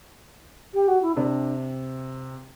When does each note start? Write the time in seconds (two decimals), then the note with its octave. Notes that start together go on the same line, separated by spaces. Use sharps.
0.74 G4
0.88 F#4
1.02 E4
1.15 C3 D4